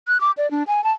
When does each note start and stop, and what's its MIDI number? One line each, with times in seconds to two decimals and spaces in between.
0.08 0.20 90
0.21 0.31 86
0.37 0.50 74
0.51 0.63 62
0.67 0.84 80
0.84 0.92 81